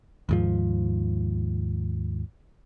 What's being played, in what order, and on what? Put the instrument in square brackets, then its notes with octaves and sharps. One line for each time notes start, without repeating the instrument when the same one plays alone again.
[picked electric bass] D#2 G#2 F3